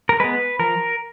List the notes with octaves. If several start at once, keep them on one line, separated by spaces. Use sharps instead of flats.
A#4
G#3 B3 B4
F3 A#4